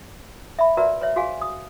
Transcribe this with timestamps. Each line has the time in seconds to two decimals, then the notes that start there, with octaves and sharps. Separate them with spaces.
0.59 E5 B5
0.77 F#4 A#4 B4 D5 E5 A#5
1.01 B4 C#5 E5
1.16 F#4 G#4 F5 G#5
1.41 D#6